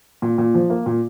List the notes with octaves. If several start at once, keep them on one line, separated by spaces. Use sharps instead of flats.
A#2
A#2
F3
A#3
A#2